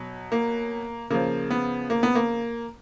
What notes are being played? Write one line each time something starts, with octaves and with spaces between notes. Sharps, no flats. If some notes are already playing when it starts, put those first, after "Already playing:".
Already playing: B2 F#3
A#3
C#3 F3 A#3
B3
A#3
B3
A#3